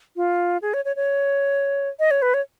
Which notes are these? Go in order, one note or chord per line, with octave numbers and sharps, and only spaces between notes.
F4
G#4
C#5
C#5
C#5
D#5
C#5
B4
C#5